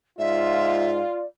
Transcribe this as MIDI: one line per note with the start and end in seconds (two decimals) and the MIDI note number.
0.19 1.02 44
0.19 1.24 65
0.19 1.26 74
0.19 0.91 76